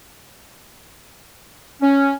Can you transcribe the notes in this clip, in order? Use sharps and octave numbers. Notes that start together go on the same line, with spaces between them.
C#4